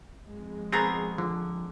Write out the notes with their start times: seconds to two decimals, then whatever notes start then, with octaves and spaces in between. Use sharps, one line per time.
0.24 F2 G#3
0.73 B2 B3 C4 G#4 A#4
1.18 D3 F3